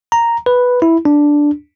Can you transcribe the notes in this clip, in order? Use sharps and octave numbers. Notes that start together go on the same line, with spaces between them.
A#5
B4
E4
D4